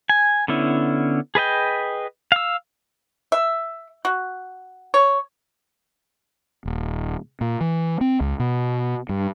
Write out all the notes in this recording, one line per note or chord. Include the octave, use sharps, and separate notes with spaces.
G#5
D3 B3 C#4 E4
G#4 B4 D#5 G5
F5 E6
E5
F#4
C#5
D#1
A#2
E3
C4
C#2
B2
G2